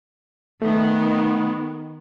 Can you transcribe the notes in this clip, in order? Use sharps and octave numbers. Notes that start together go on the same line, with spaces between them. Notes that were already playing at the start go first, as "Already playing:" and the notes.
D#3 A3 B3